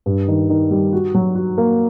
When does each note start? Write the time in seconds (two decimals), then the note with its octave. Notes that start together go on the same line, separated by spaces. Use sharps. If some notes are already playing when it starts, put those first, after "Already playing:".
0.06 G2
0.28 D#3
0.50 D#3
0.71 G3
0.93 F#4
1.14 F#3
1.35 F#4
1.58 A#3